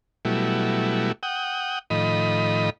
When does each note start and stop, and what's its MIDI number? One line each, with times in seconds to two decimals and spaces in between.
0.25 1.12 47
0.25 1.12 54
0.25 1.12 55
0.25 1.12 57
0.25 1.12 64
1.23 1.79 78
1.23 1.79 79
1.23 1.79 87
1.90 2.70 45
1.90 2.70 51
1.90 2.70 53
1.90 2.70 75
1.90 2.70 83